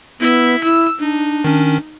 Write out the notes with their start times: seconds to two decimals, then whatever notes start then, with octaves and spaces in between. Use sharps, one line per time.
0.20 B3 E4 E5
0.64 E4 E6
0.99 D4 D#4
1.44 D#3 C#4